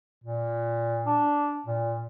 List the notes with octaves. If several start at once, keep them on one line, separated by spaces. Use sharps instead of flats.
A#2
D4
A#2